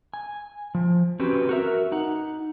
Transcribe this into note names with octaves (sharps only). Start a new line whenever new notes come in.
G#5
F3
C4 C#4 F#4 G4 B4
F#4 A#4 E5
D#4 F#5